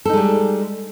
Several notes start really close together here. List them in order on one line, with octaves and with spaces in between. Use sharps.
A4 D#4 G#3 G3